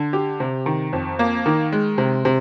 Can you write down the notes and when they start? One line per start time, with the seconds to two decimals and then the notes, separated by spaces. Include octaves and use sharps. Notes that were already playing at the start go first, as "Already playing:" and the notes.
Already playing: D3
0.13 G4
0.40 C3
0.66 D#3
0.93 F2
1.19 A#3
1.46 D#3
1.72 G#3
1.98 C3
2.25 C3